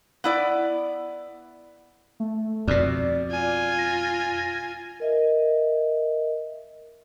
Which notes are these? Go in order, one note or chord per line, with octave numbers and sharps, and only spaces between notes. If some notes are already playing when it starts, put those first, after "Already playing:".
B3 E4 D5
A3
F2 B2 D5
F4 G#5
A#6
A#4 D#5 E5